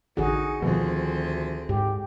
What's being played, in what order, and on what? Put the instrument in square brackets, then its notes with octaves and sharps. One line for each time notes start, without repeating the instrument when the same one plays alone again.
[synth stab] A1 D3 [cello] D#4 [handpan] F#4 G#4
[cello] D2 C4 [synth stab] B2 [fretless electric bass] D#3 F3
[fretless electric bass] G#2 [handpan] G4